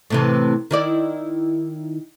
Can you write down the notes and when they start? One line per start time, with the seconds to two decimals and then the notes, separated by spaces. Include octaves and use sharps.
0.10 A2 C3 E3
0.71 D#3 E4 D5